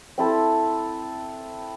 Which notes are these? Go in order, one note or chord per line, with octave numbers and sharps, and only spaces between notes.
C4 E4 A4